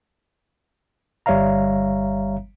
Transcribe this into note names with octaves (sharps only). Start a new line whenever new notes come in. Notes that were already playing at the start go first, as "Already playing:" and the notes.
G1 G3 C#5 E5 F5 A#5